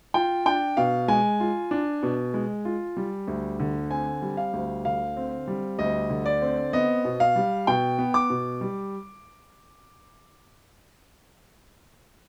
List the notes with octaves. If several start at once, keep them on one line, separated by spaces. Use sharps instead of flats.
F4 G5
D4 G5
B2 F5
G#3 G#5
F4
D4
B2
G#3
F4
G3
D2
D3
C4 G#5
G3
F5
D2
D3 F5
C4
G3
D2 D#5
D3
D5
C4
B3 D#5
B2
F5
G3
B2 G5
B3
D6
B2
G3